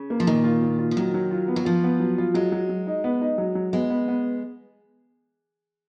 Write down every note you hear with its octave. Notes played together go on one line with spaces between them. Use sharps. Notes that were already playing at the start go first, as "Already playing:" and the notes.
Already playing: C#3
A#3
F3
A#2 D#3
F4
A#2
F4
F3
D#3 F#3
F#3
F4
B3
F#3
F3 F4
B3
F#3
F4
F#3 G#3
F#3
F#3
D#4
B3
D#4
F#3
F#3
G#3 B3
B3
B3